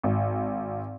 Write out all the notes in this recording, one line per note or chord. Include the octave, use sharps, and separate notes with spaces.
G#1